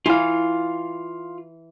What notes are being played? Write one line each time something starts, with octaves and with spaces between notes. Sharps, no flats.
E3 F4 F5